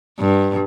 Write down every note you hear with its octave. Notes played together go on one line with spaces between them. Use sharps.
G2